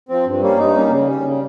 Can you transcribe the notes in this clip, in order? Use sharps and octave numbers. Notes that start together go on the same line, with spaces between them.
F3 C4
G2
G3 A#3 C#4
G2 D#4
G3 A#3 C#4
C#3
G3 C#4
C#3